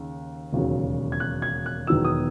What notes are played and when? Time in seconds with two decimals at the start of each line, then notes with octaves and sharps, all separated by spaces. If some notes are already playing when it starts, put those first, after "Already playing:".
Already playing: D#2 C#3
0.53 E1 D#2 C#3 F#3
1.12 G#6
1.20 F#6
1.42 G#6
1.66 F#6
1.87 E1 E2 D#3 F#3 E6
2.04 D#6